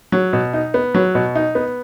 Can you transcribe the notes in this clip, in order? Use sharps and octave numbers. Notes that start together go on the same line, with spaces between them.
F#3
B2
D#4
B3
F#3
B2
D#4
B3